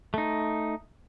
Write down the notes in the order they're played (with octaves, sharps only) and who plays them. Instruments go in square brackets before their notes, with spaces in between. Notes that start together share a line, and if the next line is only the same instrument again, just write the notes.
[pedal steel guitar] A3 D#4